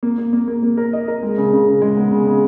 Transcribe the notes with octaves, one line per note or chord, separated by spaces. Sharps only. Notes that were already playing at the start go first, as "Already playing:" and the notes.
A#3
A#3
A#3
A#3
A#3
A#4
D#5
A#4
G#3
C#3
C#3
C#3
G#3
B3
C#3
C#3